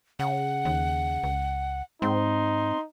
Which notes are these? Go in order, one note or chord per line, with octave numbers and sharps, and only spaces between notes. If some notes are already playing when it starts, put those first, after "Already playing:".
C#3 F#5
D#2
C#2
G#2 C4 D#4 C6